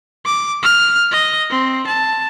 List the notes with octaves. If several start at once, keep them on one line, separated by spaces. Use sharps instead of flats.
D6
F6
D#5
C4
A5